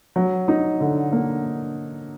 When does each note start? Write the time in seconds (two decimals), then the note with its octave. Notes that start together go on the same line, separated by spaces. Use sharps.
0.16 F#3
0.48 D#4
0.81 D3
1.12 A#3